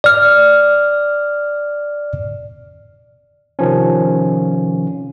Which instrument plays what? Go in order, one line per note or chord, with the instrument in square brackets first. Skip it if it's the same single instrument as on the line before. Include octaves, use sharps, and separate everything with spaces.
[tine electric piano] D5 F6
C3 D#3 F3 C#4